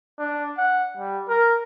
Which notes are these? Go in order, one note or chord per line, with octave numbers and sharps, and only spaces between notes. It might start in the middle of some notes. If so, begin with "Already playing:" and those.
D4
F#5
G3
A#4